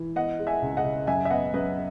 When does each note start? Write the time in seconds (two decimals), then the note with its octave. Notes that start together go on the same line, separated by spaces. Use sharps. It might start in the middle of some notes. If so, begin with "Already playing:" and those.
Already playing: E3
0.16 B3 D#5 F#5
0.39 G#3
0.47 E5 G#5
0.62 C#2
0.77 D#5 F#5
0.85 C#3
1.07 F#2 E5 G#5
1.25 E5
1.30 B3 D#5 F#5
1.54 F#2 B4 D#5